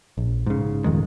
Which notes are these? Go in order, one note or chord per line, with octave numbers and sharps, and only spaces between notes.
A#1
G#2 C#3
D#1 F2 D#3 G#3